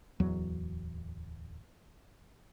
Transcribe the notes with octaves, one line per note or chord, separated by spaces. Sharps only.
D1 E2 F#3